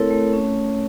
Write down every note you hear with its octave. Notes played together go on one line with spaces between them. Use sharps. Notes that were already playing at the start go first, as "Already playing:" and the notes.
Already playing: A3 C4 E4 A4 A#4 C#5
A3
C#4